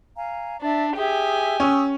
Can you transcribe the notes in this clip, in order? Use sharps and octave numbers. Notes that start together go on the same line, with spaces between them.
F5 G#5 A#5
D4 D5 E5
G4 G#4 E5 G#5 D#6
C#4 C#6 D#6 E6